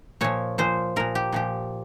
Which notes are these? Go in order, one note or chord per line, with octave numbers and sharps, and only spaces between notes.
A#2 F3 C#5
A#2 F3 C5
A#2 F3 A#4
G4
A#2 F3 G4